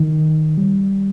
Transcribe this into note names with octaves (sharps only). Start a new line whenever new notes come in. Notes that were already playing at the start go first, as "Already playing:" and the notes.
Already playing: D#3
G3